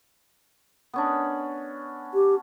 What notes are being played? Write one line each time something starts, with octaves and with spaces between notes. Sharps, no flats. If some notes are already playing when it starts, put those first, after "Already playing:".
B3 C#4 D4
G4